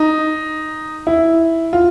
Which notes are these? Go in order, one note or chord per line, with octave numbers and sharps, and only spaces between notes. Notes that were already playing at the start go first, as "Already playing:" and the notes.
Already playing: D#4
E4
F4